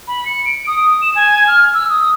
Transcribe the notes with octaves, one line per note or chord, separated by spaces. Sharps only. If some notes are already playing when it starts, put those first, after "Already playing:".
B5
C#7
D7
D#6
E7
G#5
F6
E6
D#6